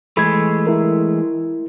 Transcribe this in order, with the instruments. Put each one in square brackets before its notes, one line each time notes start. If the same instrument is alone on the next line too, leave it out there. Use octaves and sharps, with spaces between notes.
[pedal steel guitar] E3 G#3 A3 [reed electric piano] B5 G#6
[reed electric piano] E4 A#4